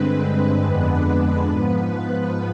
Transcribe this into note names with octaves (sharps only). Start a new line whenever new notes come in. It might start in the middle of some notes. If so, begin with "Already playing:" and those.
Already playing: G2 D3 G#3 C4 B4
F2 D3 G#3 B3 D4 B4
G#2 F3 B3 B4